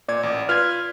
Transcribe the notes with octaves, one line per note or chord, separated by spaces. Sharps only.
A#2 D5 G#6
A1
F4 B4 D5 F6 G#6